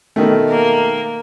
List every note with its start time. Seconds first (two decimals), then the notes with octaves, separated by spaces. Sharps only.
0.16 B2 D#3 A3
0.49 A#3